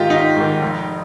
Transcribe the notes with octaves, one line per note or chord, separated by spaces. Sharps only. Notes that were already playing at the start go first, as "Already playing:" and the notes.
Already playing: G#2 D#3 D#4 F4 G4
G#1 D#4
G#2 D#3
F1